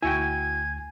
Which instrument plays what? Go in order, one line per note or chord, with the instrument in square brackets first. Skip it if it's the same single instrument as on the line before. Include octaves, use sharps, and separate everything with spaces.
[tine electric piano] D2 G#5 [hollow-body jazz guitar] E4 F#4 G5 [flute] G#6